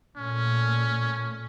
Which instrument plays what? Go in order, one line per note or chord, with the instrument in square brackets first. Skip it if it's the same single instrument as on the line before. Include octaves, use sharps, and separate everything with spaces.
[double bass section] A#2 A3 [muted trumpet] C#4